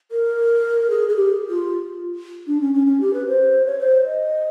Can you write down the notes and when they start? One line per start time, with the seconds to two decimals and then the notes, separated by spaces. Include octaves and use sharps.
0.11 A#4
0.90 G#4
1.09 G#4
1.16 G4
1.49 F4
2.47 D4
2.61 C#4
2.74 C#4
2.87 C#4
3.00 G4
3.14 B4
3.27 C5
3.66 C#5
3.79 C5
4.05 D#5